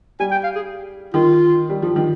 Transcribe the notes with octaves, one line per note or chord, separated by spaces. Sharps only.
G3 G#5
G5
F5
G#4
D#3 F4
G3
F3
D#3